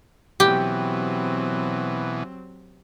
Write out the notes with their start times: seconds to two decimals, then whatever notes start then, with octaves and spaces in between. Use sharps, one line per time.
0.40 B2 E3 F#3 C4 G4